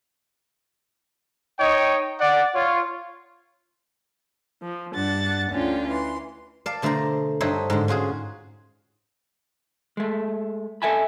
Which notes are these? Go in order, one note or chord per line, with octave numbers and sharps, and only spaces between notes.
D#4 C#5 D#5 G5
D5 F#5
F4 C#5
F3
G2 D4 F#5 A6
D2 D3 C#4 D4 F4 G5
E3 C6
D5 F5 A5
B2 D3 A3 C5 D5 A#5
G2 D4 D#4 C5 C#5 E5
G#2 D3
C#4 F4 F#4 G#4
G#3 A3
A4 E5 G#5 A5 B5